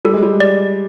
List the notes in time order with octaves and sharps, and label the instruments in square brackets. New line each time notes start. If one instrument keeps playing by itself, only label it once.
[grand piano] G3 [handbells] A4
[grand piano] G#3
G3
[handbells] D5